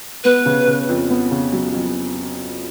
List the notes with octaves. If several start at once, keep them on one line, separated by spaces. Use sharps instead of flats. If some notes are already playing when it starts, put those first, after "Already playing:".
B3 B4
C#3
C#3
F2
B3
C#3
F#3
F2